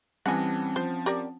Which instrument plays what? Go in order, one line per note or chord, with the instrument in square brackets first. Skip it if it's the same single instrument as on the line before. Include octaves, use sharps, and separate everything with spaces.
[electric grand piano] E3 G3 [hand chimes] C4 C#4 A5 [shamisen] F#5 G#5
[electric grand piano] F3 [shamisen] C5
[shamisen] G4 A#4 D5